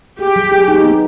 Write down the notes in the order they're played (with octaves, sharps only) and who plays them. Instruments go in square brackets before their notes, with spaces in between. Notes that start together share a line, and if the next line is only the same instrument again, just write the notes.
[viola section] G4 [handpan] G#4
[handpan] F#3
G#4
D#4
B3